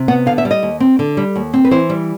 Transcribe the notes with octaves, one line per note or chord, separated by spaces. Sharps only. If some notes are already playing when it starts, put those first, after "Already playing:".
Already playing: C3
B3 F#5
D3 F5
E5
G3
D#5
D#2
C4
D3
G3
D#2
C4
B4
E3 C5
G3